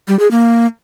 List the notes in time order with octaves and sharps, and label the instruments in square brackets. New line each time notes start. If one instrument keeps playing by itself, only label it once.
[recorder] G3
G#4
A#3